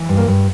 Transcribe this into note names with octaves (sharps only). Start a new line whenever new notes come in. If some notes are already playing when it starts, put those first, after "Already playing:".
Already playing: E3
G2
A#3
G2